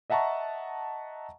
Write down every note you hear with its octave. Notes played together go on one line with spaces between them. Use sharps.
D#5 E5 F#5 A5 A#5 C#6